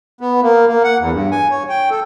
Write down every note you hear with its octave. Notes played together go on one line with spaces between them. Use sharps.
B3
A#3
A#3
F#5
E2
G2
G#5
C#5
G5
A4